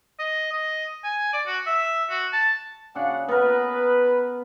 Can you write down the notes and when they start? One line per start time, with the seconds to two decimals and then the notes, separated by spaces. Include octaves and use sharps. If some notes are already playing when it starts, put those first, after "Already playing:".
0.19 D#5
0.52 D#5
1.04 G#5
1.33 D5
1.47 F#4
1.67 E5
2.10 F#4
2.33 A5
2.95 C#3 D4 F#4 F#5
3.28 B3 A#4 B4